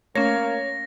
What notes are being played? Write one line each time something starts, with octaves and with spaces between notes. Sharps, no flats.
A3 A#3 C#4 C#5 A#6